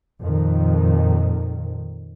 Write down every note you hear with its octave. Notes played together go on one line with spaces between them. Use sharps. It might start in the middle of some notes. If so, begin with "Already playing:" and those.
F2 A#2 D#3